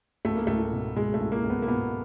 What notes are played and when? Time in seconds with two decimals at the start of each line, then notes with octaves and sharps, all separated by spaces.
0.25 C#2 A3
0.36 A#3
0.47 C#2 A3
0.73 B2
0.96 B2 G#3
1.14 A3
1.20 C#2
1.32 A#3
1.44 C#2
1.50 B3
1.62 A#3
1.68 B2 B3